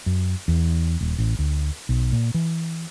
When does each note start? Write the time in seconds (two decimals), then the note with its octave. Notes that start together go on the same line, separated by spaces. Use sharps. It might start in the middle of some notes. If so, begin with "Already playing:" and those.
0.06 F#2
0.48 E2
1.01 D#1
1.18 A1
1.39 D2
1.89 B1
2.12 A#2
2.34 E3